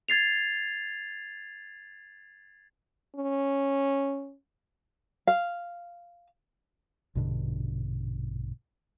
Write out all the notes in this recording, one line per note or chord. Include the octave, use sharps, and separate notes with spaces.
G#6 A6 C7 F7
C#4
F5
A#1 G2 B2 D3